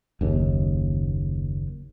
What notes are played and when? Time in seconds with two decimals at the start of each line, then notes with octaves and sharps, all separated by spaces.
0.21 F#1 D#2